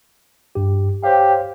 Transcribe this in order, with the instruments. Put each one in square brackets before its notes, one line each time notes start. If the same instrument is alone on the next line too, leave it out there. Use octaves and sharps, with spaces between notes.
[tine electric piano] G2 G4
[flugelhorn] G4 [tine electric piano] C5 C#5 F5